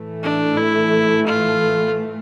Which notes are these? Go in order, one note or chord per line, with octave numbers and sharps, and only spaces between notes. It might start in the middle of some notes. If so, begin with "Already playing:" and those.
Already playing: A2 E3 A3
D4
E4
F4